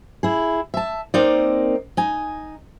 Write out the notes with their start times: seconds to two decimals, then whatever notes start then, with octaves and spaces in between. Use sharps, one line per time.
0.23 E4 G#4
0.74 E5 A5
1.14 A#3 C4 D#4 A#4 D5
1.97 D#4 G#5